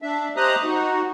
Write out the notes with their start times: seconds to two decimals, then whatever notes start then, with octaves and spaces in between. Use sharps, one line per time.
0.02 D4 E5
0.37 G4 C5 D#5 A#5 D#6 F#6
0.63 D#4 F#4